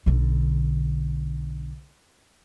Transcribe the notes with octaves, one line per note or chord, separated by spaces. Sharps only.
B1 D3